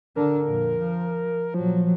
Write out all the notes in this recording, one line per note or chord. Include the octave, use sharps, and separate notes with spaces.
D3 D4 A#4
F2 A#2
F3
A#2 F3 F#3